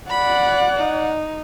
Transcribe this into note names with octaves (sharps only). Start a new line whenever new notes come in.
D5 F#5 B5
D#4